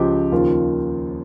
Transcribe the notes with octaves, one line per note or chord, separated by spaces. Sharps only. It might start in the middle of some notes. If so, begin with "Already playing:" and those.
Already playing: C#2 C#3 F3 G4
D#2 C#3 F3 F4